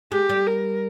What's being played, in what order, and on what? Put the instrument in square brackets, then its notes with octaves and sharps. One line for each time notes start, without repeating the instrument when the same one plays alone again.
[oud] G#3 [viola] G4
[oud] G3
[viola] A#4